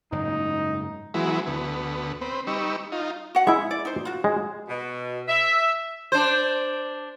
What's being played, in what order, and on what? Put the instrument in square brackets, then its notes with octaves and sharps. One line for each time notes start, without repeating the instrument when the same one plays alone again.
[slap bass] F#1 G#2 G#3 [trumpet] D#4
[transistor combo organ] E3 F#3 G#3 B3 E4
D2 B3
C4 B4
G3 D#4 B4 C#6 E6
D#4 F4
[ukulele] F#4 F#5
[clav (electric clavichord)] G#3 E4 [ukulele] E5
[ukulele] D5
D#4 C5
F4 F#4
[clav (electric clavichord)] G#3
[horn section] B2
E5
[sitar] D4 C5